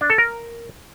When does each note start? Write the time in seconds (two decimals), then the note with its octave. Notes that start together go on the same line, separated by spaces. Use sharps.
0.01 D4
0.10 A4
0.18 A#4